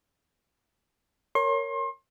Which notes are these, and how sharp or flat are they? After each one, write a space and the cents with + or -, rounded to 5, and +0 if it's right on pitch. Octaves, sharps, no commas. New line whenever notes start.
A#4 -10 C#5 +0 C6 +35